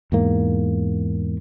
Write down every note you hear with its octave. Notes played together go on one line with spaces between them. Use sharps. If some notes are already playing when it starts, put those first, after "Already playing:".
E2 G#2 A#3